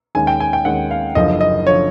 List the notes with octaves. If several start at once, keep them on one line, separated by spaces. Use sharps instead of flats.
D#2 D#3 G#3 C#4 G#5
G5
G#5
G5
D#2 D#3 G#3 C#4 F#5
F5
F#1 F#2 D3 F3 D#5
D#5
D3 F3 C#5